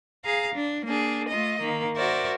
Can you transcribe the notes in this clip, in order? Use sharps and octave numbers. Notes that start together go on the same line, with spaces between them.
G#4 F5 A#5
D4
A#3 D4 G#4
A3 F4 D#5
D#3 A#3
F#4 A#4 C5 D5 E5